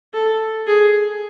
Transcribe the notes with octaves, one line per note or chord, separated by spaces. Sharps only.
A4
G#4